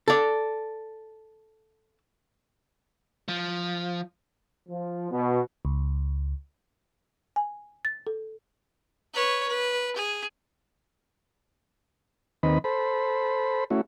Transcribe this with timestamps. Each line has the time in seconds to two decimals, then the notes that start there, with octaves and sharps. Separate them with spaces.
0.08 A4 D5
3.28 F3
4.69 F3
5.11 B2
5.65 C#2
7.36 G#5
7.85 A6
8.07 A4
9.14 B4 C#5
9.48 B4
9.96 G#4
12.43 D#2 D#3 C4 B4 D#5 B5
12.64 A4 C5 B5
13.70 A3 C#4 E4 F#4